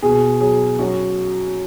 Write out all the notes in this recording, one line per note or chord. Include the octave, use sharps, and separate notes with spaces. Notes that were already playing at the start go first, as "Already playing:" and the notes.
B2 G#4
F#3 G#4
F#2 F#4